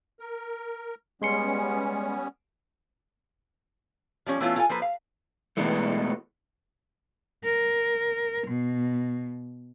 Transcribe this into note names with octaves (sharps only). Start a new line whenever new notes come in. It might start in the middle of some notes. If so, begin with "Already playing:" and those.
A#4
G3 G#3 B3 C#4 C6 C#7
F3 G3 C#4
E3 A3 B3 C#4 E4 F4
F4 A4 G#5
F3 A#3 A4 B4
F5
E2 B2 E3 G#3 A3
A#4
B2